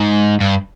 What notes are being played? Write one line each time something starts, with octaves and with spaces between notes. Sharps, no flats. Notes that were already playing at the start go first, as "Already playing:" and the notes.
Already playing: G#2
G2